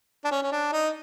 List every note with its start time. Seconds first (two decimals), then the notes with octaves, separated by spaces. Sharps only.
0.25 D4
0.31 C#4
0.43 C#4
0.52 D4
0.72 D#4